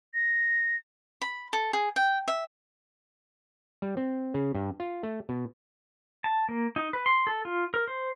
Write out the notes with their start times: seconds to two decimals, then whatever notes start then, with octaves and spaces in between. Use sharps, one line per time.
0.14 A#6
1.22 B5
1.53 A4
1.73 G#4
1.96 G5
2.28 E5
3.82 G3
3.97 C4
4.34 C#3
4.55 G2
4.80 F4
5.03 A3
5.29 B2
6.24 A5
6.49 A#3
6.76 D#4
6.93 B4
7.06 C6
7.27 A4
7.45 F4
7.74 A#4
7.88 C5